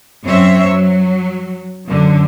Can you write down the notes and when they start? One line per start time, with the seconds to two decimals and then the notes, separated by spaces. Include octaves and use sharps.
0.25 F#2 C4 C5 C#5 E5
0.68 F#3
1.88 F#2 D3